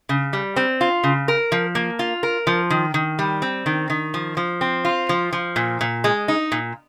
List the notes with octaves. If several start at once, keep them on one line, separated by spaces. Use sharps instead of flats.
C#3
G3
C4
F4
C#3
A#4
F3
A#3
F4
A#4
F3
D#3
D#3
G3
C4
D#3
D#3
F3
F3
C4
F4
F3
F3
A#2
A#2
G#3
D#4
A#2